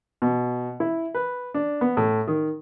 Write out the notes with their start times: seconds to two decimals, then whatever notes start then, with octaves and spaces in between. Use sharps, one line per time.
0.22 B2
0.80 E4
1.14 B4
1.54 D4
1.81 B3
1.97 A2
2.28 D#3